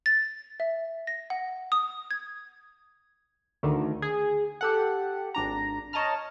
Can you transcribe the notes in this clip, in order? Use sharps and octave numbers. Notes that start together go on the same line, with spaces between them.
A6
E5
A#6
F#5
D#6
G#6
D2 D3 D#3
G#4
G4 A4 F#5
G#1 D4 A#5
C#5 D#5 A5 A#5 F6